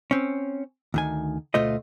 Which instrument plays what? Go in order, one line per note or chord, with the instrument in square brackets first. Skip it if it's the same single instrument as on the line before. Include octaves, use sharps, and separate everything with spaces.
[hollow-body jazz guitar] C4 C#4
D2 D#3 G#5
D2 B2 A3 F4 C5 D#5